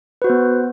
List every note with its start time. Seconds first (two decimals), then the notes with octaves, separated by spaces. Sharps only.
0.22 B4
0.24 F#4
0.27 C5
0.30 B3